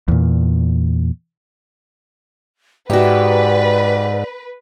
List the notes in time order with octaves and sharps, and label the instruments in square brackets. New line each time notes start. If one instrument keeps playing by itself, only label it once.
[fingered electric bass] E2 A#2
[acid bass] G#2 [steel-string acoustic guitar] F#4 G4 [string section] B4 [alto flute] D5